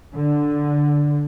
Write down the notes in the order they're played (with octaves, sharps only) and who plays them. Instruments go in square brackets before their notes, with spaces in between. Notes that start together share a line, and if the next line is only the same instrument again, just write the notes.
[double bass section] D3